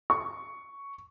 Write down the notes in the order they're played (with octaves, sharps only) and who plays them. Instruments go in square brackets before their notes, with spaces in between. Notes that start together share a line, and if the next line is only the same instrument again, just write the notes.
[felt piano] C#6